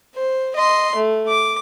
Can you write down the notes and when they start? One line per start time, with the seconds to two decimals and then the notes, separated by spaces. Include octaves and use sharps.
0.16 C5
0.56 D#5 C6
0.96 A3
1.29 D6